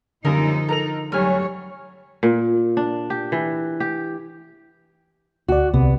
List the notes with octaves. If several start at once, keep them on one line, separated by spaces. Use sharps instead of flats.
F#2 D3 F3 G3 A#3 D#4 A#4 D#5
A4 A#4 A#5 F7
F1 F#3 G3 C#5 G#5 F6
A#2
D4
G4
E3
G4
D2 F#4 D5
C2 C3 B3